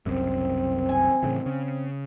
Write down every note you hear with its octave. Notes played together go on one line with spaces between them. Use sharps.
F#1 C2 F#2 C4
G#5
A2 C#3 E3
C#3